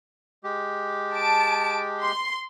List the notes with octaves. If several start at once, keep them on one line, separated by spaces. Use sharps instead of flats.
G#3 G4
A5 D7
C6